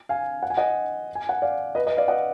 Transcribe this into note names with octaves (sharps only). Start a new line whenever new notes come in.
F5 G#5
F#5
G#5
D#5 F#5
G#5
F#5
D5 F5
B4 D#5
B4 D#5
D5 F5
D#5 F#5